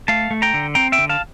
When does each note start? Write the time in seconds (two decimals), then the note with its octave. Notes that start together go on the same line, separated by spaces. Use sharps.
0.08 A3 F5 A5
0.31 A3
0.42 G5 A#5
0.54 D3
0.75 C4 G5 A#5
0.92 E5 G5
0.98 D3
1.09 F5 A5